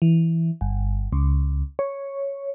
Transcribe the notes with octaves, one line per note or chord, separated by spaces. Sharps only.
E3
G1
C#2
C#5